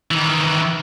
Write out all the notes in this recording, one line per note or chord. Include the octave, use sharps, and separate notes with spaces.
D#3 E3